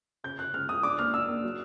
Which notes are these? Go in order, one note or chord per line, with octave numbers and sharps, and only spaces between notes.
C#3 G6
C#3 F#6
C#2 F6
C#2 D#6
D4 D6
A#3 F6
D4 E6
A#3
F#3